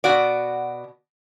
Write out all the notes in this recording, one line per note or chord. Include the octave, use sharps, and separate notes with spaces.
B2 F#4 D5